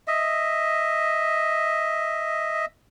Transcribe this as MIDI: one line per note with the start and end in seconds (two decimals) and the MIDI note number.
0.08 2.66 75
0.08 2.66 76